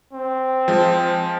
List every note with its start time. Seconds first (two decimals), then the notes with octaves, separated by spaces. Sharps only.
0.13 C4
0.68 F3 G#3